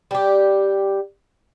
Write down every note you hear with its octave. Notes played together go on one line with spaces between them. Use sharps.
G3 G4